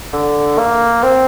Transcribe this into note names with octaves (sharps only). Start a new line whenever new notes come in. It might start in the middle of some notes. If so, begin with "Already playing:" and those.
D3
A#3
C4